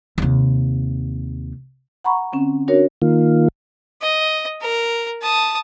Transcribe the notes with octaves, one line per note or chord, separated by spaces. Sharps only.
D#2 C3
F#5 A#5 B5 C#6
D3 C4 C#4
D4 F#4 A#4 C#5
D#3 A#3 F4
D#5
A#4
A5 D#6